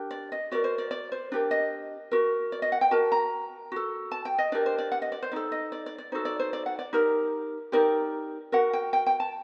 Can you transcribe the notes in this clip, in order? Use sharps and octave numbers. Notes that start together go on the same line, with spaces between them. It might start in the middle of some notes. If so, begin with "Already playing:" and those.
Already playing: D4 G4 A#4
D5
D#5
F#4 A#4 D5
C5
D5
D5
C5
D4 G4 A#4 D5
D#5
F#4 A#4
D5
D#5
F#5
G5
F#4 A#4 A5
A#5
F#4 A4
A5
G5
D#5
D4 G4 A#4 D5
C5
D5
F#5
D#5
D5
C5
D#4 A4 D5
D#5
D5
D5
D5
D#4 F#4 A4 C5
D5
C5
D5
F#5
D5
D#4 G4 A#4
D#4 G4 A#4 D5
F#4 A#4 F#5
G5
G5
G5
A5